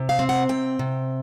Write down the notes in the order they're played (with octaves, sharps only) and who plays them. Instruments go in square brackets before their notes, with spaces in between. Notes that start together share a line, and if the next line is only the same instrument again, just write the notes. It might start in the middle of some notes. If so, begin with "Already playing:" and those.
Already playing: [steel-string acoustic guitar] C3
F5
C4
F#5
C3 G5
C3